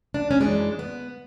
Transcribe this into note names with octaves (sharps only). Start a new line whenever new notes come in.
D4
C#4
F#2 E3 G#3 D4
B3